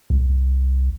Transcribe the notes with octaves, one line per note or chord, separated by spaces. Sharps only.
C2